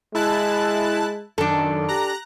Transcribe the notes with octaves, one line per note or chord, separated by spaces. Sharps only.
G#3 E4 A5 F#6
F#2 D#3 D4 A4
G4 A#5 F#6 A#6